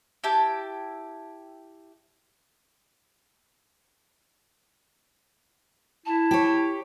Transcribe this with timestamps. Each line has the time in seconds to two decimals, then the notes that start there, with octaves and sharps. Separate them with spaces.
0.24 E4 G4 A5
6.06 E4 A5
6.31 G4 C#5